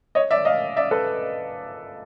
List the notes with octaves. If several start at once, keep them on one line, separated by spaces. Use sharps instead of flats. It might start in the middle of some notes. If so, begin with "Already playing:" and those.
C#5 D#5
D5 E5
D#5 F5
D5 E5
A4 B4